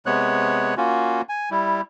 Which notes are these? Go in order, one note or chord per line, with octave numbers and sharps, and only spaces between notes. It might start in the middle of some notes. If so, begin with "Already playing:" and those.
C3 G#3 B3 C#5 F#6
A#3 C#4 F4 F#4
G#5
G3 E4